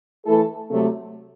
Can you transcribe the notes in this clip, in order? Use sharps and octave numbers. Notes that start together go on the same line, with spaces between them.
E3 A3 E4 A4
C3 F#3 A3